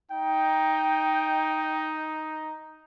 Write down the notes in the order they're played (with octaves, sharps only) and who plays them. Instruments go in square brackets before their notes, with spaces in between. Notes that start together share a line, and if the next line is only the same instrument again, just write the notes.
[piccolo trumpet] D#4 [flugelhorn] G5